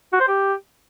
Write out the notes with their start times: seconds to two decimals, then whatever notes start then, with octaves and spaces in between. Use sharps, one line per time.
0.13 F#4
0.20 C5
0.28 G4